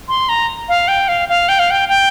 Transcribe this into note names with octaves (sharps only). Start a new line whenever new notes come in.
C6
A#5
F5
G5
F5
F5
G5
F5
G5
G5